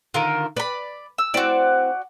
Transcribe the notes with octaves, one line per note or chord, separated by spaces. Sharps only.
D3 D#3 F4 A#4
B4 D5 B5
E6
C4 E4 F#4 D5